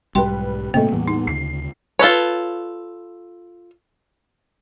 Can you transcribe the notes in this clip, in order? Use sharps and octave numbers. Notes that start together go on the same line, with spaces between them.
B1 G#2 G3 B4 G5 C6
G2 A#2 C#3 A3 A#3 C4
E2 A2 E3 G3
D#4
D2 C#3 C7
F4 A4 B4 C#5